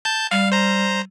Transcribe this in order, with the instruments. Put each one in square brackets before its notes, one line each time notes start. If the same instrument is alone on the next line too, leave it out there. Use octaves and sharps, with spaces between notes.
[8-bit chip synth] A5 G6
[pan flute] G3 [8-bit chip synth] F5
[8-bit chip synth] C5 A#5